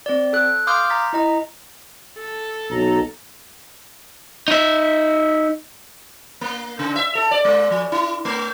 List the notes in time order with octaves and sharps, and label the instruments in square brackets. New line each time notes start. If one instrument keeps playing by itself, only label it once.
[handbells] C4 D5
A4 F#6
F5 C6 D6 D#6 F6 G6
A#5 A6 B6
E4 D#5 A#5
[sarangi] A4
[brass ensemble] B1 A#5
[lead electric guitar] D#4 E5
[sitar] A#3
C#3
E5
A4
D5
G#3
F3
E4
A3